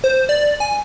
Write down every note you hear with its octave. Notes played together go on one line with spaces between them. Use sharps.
C5
D5
G#5